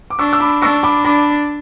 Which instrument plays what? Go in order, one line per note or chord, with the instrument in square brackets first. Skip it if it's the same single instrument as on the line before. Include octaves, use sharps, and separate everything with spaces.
[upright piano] D6
[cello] D4 [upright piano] C#6 E6
[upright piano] E6
B5 D6
[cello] D4 [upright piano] C#6 E6
[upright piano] B5 D6
[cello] D4 [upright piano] B5 D6